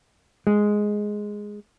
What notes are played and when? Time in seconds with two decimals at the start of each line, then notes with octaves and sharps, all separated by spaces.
0.47 G#3